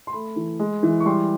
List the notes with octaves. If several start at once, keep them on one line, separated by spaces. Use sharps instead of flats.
C6
A3 B5
E3
G#3
E3
C#6
G3 C6